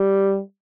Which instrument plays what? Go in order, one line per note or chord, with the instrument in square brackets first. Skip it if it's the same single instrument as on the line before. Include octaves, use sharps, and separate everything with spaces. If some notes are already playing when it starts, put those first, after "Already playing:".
Already playing: [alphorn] G3